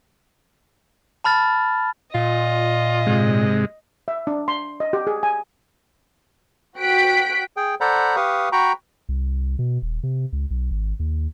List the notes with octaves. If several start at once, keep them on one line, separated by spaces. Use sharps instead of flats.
A5 B5 F6 A6
A#2 F4 D#5
G#2 C3 G#3
E5
D4
C6
D#5
G4
G#4
G#5
F#4 G5 F#6 B6 D7
G#4 G5
A4 C5 D5 F#5 A#5 B5
G4 B4 F5 C#6 D#6
F#4 G5 A#5 B5 C#6
C2
B2
D#1
C3
C#2
B1
G#1
D#2